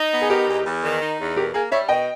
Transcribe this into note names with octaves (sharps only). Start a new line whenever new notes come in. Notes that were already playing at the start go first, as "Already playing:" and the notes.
Already playing: D#4
B3
G#4
D#4 G4 A#4
E2
E2
D#3
D#4
E2
B2 G4 A#4
A#3 G#4
G3 C#5 E5
B2 D#5 G5